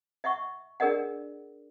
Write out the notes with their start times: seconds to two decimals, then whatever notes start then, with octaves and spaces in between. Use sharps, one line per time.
0.24 D#5 E5 F#5 C#6
0.80 D4 G#4 A#4 D5 D#5 F#5